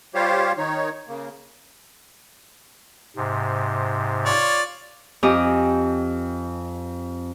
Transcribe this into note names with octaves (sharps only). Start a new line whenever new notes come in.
G3 F4 G4 C5 C#5 F5
D#3 D#4 C#5
C#3 A#3
G#2 C3
F4 C#5 D5
F2 G4 D#5 G#5